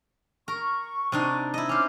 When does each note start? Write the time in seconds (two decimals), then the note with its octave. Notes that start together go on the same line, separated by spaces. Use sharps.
0.48 A#4 C#6
1.12 C3 D4 D#4
1.54 E4 D#5
1.69 C#4 C5 D6 F6